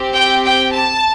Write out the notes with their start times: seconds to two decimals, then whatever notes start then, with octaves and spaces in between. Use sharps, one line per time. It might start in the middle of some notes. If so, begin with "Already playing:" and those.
Already playing: C4 G4
0.13 G5
0.43 G5
0.72 A5